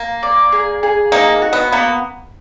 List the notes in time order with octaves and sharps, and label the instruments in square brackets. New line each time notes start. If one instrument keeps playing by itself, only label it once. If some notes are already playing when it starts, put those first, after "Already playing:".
Already playing: [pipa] A#3
[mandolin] D5
G#4
G#4
[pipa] A#3 [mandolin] D#4
[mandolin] F#4
[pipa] B3
[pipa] A#3 [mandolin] B3